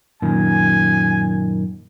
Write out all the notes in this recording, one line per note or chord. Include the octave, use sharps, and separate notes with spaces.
F#2 A#2 D#3 G#5